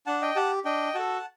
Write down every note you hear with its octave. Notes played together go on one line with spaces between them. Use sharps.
D4 F#5 A5
D#5 G5
G4 F#5 A5
D4 D#5 G5
F#4 A4 F#5 A5